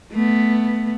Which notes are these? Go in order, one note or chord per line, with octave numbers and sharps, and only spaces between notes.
A3 B3